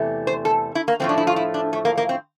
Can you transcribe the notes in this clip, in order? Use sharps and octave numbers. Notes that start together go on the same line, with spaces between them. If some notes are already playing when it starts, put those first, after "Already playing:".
Already playing: E2 C3 E3 A3
C5
A4
E4
A#3
A2 F3 A3 C4
D4
E4
F4
E4
D4
A3
A#3
A#3
C4